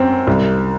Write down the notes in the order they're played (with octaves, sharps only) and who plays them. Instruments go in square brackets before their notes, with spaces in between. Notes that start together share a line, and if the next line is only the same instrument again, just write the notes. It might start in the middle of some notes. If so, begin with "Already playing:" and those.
Already playing: [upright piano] F#2 C4
C2